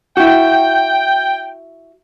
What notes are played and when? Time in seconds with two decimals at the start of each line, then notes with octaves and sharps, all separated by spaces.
0.17 E4 F#4 G5